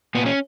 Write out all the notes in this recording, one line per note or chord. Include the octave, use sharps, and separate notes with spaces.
A#2 B3
C#4